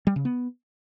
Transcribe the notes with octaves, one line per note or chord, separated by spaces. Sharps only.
G3
C#3
B3